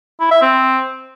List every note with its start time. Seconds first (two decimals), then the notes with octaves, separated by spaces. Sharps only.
0.20 E4
0.31 E5
0.42 C4